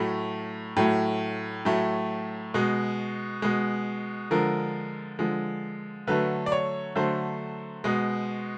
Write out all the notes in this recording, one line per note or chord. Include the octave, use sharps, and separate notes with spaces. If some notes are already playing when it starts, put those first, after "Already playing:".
Already playing: A2 F#3 A3
A2 F#3 A3
A2 F#3 A3
B2 G#3
B2 G#3
D3 F3 G#3 A#4
D3 F3 G#3
D3 F#3 A3 B4
D5
C#5
D3 F#3 A3 C5
B2 G#3